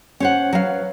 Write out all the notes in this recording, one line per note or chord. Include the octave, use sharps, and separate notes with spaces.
C#4 C5 F#5
F#3 B4 F5